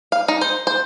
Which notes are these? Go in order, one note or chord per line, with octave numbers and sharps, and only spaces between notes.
F5
D#4
C5
C5